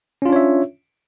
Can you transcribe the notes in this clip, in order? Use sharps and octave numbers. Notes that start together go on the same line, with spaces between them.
C#4 D4 F4 C#5 E5